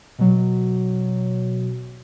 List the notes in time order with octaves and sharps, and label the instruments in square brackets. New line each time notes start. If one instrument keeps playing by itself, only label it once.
[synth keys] B2 F#3